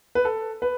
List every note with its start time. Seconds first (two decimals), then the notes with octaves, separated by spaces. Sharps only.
0.15 B4
0.25 A4
0.62 B4